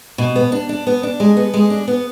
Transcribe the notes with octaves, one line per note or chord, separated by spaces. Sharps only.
B2
B3
D4
D4
B3
D4
G#3
B3
G#3
D4
B3